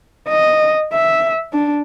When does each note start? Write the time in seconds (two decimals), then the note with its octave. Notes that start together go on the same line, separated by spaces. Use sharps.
0.28 D#5
0.93 E5
1.53 D4